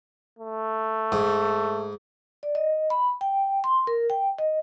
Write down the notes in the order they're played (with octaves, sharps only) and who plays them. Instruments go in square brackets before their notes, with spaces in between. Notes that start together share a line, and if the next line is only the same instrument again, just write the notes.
[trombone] A3
[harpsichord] G#2
[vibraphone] D5
D#5
B5
G5
C6
A#4
G5
D#5